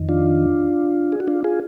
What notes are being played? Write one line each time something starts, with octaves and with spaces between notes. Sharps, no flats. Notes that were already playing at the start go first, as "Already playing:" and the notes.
Already playing: F2 D#3
D4 F4
G#4
F#4
D4 F4
F4 G#4